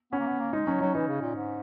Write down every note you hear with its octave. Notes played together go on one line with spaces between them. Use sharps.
B3 C#4
A#3
B3
A#3
G#3 D#4
F#3 C#4
F#3 D#4
E3 D#4
C#3
A#2
G#2